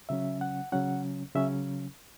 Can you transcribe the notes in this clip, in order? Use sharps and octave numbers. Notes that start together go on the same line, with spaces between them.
C#3 F#3 C#4 E5
F#5
C#3 F#3 C#4 F#5
C#3 F#3 C#4 E5